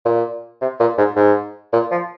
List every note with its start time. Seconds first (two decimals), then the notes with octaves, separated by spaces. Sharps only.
0.05 A#2
0.62 C3
0.80 A#2
0.98 G#2
1.16 G#2
1.73 A#2
1.91 F3